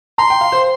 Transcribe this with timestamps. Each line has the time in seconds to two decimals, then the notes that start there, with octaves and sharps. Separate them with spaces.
0.18 A#5 C6
0.30 G5
0.41 F5
0.52 C5